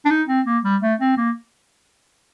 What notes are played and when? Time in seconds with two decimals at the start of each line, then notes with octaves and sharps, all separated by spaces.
0.05 D4
0.10 D#4
0.28 C4
0.46 A#3
0.64 G3
0.82 A3
1.00 C4
1.17 A#3